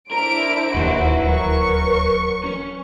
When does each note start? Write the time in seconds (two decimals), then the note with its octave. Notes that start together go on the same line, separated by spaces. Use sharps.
0.12 D4 E4 A#4 C5 D7
0.74 D1 D#2 E4 F#4 B4 C6
1.27 F#3 A#4 B4 C#6
2.44 C#4